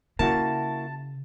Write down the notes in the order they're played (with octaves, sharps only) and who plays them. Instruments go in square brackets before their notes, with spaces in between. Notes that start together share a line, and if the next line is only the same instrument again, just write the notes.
[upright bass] C#3 [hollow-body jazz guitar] A#3 E4 F#4 [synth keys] A5